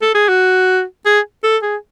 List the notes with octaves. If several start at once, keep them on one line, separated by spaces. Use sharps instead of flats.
A4
G#4
F#4
G#4
A4
G#4